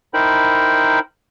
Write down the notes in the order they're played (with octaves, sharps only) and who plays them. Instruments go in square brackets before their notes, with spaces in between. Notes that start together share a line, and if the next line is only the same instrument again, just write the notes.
[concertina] D#4 E4 A#4 C5 G5 B5